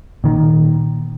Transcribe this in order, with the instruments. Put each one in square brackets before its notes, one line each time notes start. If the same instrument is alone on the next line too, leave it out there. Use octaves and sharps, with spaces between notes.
[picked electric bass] A#2 D#3